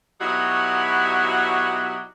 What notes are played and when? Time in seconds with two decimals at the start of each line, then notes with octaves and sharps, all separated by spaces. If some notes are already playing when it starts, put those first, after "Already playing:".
0.20 B2 F#3 G3 D#4 E4 F#4